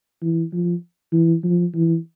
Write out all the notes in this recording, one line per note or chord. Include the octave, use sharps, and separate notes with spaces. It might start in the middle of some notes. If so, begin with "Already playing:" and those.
E3
F3
E3
F3
E3